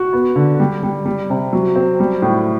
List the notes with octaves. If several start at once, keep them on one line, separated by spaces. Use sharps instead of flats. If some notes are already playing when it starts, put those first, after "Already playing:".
Already playing: F#4
B3
D3
G3
G3
G3
C3
F#3
C4
G3
A2